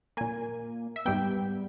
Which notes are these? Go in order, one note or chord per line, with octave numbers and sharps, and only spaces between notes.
A#2 A#3 G#5
E5
G#2 G3 B3 G5